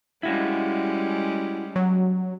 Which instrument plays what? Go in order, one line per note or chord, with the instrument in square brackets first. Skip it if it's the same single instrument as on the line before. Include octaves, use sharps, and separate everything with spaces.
[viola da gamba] G3 G#3 C#4 [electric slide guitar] E4 F#4
[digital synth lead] F#3